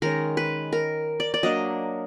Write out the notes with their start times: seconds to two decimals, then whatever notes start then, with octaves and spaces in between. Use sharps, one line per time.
0.02 D#3 G#3 C#4 A#4
0.37 B4
0.73 A#4
1.20 D5
1.34 D5
1.43 F#3 A#3 D4 D#5